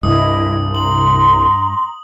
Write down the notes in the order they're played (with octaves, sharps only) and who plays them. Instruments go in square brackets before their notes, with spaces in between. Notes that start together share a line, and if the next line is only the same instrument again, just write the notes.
[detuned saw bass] C2 [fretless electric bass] G2 [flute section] E4 D#5 [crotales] D#6
[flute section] A#5 C6 [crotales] F#7